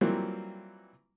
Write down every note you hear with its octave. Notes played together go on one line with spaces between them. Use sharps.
E3 F#3 G3 A#3 C4 F4